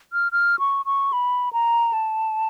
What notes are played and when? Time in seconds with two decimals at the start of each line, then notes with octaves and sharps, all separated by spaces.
0.13 F6
0.32 F6
0.59 C#6
0.86 C#6
1.13 B5
1.53 A#5
1.93 A5